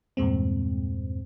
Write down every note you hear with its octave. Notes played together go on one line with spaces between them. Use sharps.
E2 G2 A#2 G#3 C4